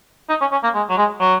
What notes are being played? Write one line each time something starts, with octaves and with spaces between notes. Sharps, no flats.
D#4
C#4
C#4
A#3
G#3
F#3
G#3
F#3